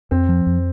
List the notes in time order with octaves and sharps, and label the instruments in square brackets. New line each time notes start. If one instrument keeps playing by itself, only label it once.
[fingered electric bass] F2 [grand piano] C4
[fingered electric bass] F3
F2